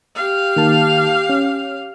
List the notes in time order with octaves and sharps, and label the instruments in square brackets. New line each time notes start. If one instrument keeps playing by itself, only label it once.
[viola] G4 F5
[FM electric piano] D#3 A#3 A5
C#4